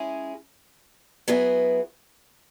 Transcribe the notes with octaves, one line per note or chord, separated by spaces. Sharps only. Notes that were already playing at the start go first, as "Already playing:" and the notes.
Already playing: G#3 C#4 E4 G#4
F#3 B3 E4 G#4